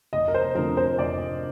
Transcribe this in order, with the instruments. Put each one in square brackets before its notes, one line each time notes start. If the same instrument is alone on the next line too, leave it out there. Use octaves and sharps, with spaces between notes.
[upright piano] F1 D#5
A#4
C5
F2 D3 F3 A#4
C5
F1 D5